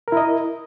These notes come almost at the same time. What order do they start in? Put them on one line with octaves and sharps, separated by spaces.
A#4 E4 D#5